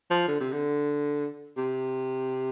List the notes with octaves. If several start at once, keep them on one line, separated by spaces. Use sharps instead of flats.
F3
D3
C3
D3
C3